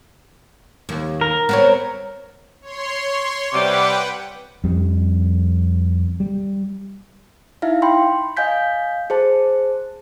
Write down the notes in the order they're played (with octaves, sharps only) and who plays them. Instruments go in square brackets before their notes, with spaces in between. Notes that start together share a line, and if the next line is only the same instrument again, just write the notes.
[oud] D#2
[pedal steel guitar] A#4
[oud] B3 C4 C#5
[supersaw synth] C#5 C6
[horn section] C3 G3 [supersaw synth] B4 F#5 G5 [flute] D6
[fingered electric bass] F2 G3
G3
[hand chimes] D#4 E4 E5 F5
G5 B5 C6
D#5 F5 G#5 G6 B6
G#4 C5 A5